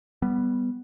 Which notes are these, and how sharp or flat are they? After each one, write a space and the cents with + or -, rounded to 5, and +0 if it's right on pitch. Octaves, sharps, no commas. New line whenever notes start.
G3 +0 B3 +0